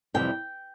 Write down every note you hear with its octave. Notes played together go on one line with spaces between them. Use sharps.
F2 C3 E3 G3 G5